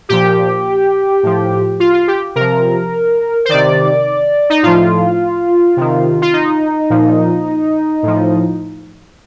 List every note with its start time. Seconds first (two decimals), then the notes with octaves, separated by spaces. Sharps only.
0.09 A#2 F3 G4
1.23 A2 F3
1.80 F4
1.94 F4
2.08 G4
2.36 C3 F3 A#4
3.45 C5
3.49 C3 D#3 D5
4.50 D#4
4.63 A2 F3 F4
5.77 C3 D#3
6.22 F4
6.33 D#4
6.90 A#2 F3
8.03 A2 F3